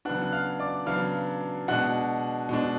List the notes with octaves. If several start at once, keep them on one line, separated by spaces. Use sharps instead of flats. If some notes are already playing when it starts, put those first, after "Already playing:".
C#3 F#3 B3 D4 F#5 F#6
F#6
F5 F6
D5 D6
C#3 F#3 B3 D4 F5 F6
B2 G#3 D4 F#5 F#6
B2 G#3 D4